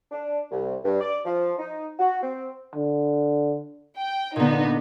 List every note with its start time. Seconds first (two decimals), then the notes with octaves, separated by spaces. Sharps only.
0.11 D4
0.51 C2
0.85 G2
1.00 D5
1.25 F3
1.59 D#4
1.99 F#4
2.23 C4
2.76 D3
3.97 G5
4.36 A#2 D3 B3 D#4